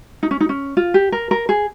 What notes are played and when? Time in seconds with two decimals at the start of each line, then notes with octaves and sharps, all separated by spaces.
0.23 D#4
0.31 C#4
0.41 D#4
0.49 C#4
0.77 F4
0.94 G4
1.12 A#4
1.31 A#4
1.49 G#4